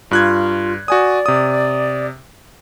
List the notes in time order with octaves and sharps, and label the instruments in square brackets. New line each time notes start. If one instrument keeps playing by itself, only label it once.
[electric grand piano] G2 F#6 G#6 [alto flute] F4
[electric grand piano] F#4 G#5 D#6 [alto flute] D5
[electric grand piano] C3 D#6